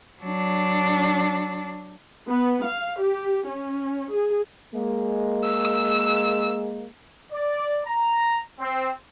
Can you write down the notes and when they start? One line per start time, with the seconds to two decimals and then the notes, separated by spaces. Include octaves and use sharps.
0.22 F#3 D4
2.28 B3
2.66 F5
3.01 G4
3.47 C#4
4.12 G#4
4.73 G#3 A#3
5.44 E6
7.31 D5
7.86 A#5
8.60 C4